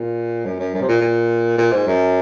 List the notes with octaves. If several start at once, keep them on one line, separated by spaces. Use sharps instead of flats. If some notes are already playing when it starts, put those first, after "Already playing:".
Already playing: A#2
F#2
F#2
F#2
C3
A#2
A#2
A#2
G#2
F#2